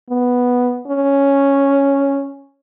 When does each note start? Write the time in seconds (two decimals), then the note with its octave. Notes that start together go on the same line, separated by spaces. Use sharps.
0.10 B3
0.87 C#4